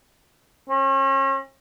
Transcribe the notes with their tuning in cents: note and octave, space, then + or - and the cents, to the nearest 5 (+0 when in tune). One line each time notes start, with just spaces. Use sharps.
C#4 -40